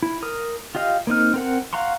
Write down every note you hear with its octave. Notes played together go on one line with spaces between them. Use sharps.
E4
A#4 D#6
F4 G4 D#5 F5
A#3 C4 D#4 F6
C4 A#4 F#5
F5 F#5 A#5 C6 C#6